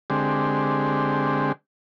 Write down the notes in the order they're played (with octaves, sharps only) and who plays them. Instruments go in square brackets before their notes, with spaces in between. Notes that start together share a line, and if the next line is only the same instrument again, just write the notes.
[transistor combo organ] D3 G#3 C4 G4